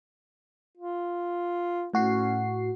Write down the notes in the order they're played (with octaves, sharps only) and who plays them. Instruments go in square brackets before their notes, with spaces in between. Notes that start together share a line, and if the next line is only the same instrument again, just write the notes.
[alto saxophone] F4
[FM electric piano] A2 F#4 C7 [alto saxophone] C#4